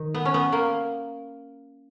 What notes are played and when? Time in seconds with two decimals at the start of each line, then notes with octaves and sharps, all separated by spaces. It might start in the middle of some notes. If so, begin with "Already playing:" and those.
Already playing: D#3
0.15 B3
0.25 C#4
0.34 B3
0.52 A#3